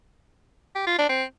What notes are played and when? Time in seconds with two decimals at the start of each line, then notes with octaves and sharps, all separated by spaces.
0.76 G4
0.87 F4
0.98 D4
1.09 C4